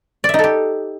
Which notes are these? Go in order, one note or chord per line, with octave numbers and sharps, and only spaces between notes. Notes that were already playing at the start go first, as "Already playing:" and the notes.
D#4 G4 A4 D5 E5